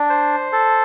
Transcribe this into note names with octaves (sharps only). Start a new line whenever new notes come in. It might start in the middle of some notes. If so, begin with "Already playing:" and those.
Already playing: D4
C5
A4